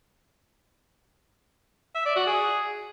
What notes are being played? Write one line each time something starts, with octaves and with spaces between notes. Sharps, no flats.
E5
D5
F#4
G#4